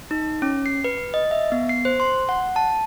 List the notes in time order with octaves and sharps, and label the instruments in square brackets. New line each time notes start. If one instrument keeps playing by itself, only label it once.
[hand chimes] D#4
C#4
C7
B4
D#5
E5
B3
C7
C5
C6
F#5
A5